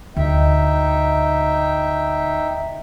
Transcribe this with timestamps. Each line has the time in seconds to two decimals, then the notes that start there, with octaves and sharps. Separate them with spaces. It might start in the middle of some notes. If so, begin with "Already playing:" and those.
0.16 D2 D#4 E5 G5